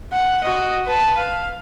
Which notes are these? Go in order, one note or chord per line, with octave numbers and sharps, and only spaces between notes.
F#5
F#4 D#5
B4 A5
F5